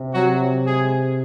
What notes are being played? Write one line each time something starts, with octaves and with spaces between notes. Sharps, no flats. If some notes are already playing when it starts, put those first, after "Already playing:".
Already playing: C3
F#3 F#4
G#3 G#4